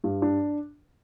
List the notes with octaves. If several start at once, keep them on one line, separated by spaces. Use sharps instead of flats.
G2
D4